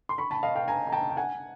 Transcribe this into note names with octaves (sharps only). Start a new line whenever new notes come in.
C6
B5 C#6
A5 B5
D#5 F5
F5 G5
G#5 A#5
A#5
G5 A5
G5
F#5 G#5